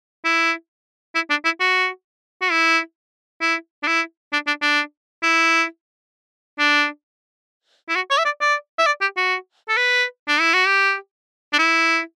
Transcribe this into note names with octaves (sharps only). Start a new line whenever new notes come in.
E4
E4
D4
E4
F#4
F#4
E4
E4
D4
E4
D4
D4
D4
E4
D4
E4
F#4
C#5
E5
D5
D5
E5
D5
G4
F#4
A4
B4
D4
E4
F#4
G4
D4
E4